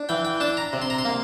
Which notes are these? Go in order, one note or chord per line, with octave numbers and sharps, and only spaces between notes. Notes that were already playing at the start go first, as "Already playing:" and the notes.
Already playing: D4
E3 G5
G5
D4 A5
A#5
C3
C6
A#5
C6
A#3